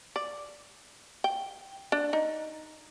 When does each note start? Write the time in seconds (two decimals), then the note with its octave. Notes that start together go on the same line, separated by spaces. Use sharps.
0.16 D5
1.24 G5
1.92 D4
2.13 D#4